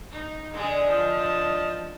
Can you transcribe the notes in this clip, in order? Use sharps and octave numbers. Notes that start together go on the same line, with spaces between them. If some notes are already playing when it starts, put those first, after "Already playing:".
D#4
D3 G#3 G#4
F3 D#5 A5